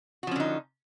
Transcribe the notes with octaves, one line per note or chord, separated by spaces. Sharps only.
D3 F3 C#4 D#4 F#4